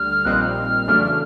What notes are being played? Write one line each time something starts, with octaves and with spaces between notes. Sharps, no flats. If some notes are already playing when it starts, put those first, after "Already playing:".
Already playing: D2 D3 G3 F6
A#1 A#2 G3 C4 D#4 F#6
F6
E2 C#3 F#3 A3 D4